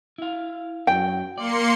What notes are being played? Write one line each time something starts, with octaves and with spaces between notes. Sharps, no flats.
E4 F5
F#2 F#3 G5
A#3 D5 C6 C#7